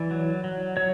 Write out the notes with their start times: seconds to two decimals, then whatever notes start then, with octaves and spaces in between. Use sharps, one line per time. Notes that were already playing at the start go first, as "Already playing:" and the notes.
Already playing: E3 D5
0.11 F#3
0.44 F#3
0.77 F#3 C#5